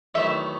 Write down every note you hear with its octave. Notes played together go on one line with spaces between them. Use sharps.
E2 D#3 F#3 A3 E4 E5